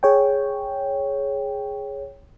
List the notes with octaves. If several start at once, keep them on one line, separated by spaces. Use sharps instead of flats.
G#4 C#5 G5